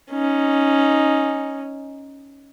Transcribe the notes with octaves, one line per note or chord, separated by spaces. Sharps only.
C#4 D#4